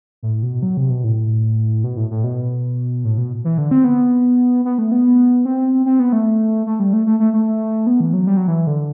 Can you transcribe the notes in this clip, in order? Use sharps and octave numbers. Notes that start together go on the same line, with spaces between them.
A2
B2
F#3
C3
B2
A2
B2
A2
A2
B2
A2
B2
E3
D3
C4
B3
B3
A3
B3
C4
C4
B3
A3
A3
G3
A3
A3
A3
A3
B3
E3
F#3
G3
F#3
E3
D3